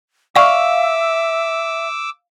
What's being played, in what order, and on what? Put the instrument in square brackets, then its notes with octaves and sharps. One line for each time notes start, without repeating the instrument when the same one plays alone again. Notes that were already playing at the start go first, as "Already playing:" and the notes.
[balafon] D5 C#6 [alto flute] E5 [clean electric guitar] F5 [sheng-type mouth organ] D6 E6